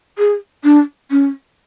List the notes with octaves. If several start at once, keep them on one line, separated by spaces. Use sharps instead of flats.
G#4
D4
C#4